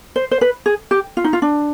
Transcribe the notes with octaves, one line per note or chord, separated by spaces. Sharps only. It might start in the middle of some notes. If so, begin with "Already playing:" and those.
C5
C5
B4
G#4
G4
F4
D#4
F4
D4